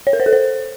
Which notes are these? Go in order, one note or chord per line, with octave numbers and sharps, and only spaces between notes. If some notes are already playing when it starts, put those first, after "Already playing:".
C#5
A#4
C5
A4
C5